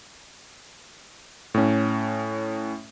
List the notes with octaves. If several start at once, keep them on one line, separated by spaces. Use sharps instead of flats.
A2 C#4